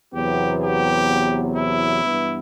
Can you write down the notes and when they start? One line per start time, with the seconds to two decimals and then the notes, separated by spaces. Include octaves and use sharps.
0.14 E2 C3 F#3 B3 G4
0.61 G4
1.55 E4
2.02 G2 E3 B3